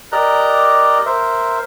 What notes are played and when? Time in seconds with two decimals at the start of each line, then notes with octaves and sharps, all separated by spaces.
0.12 G4 A#4 D5 D#5 A#5 F#6
1.06 A#4 C5 E5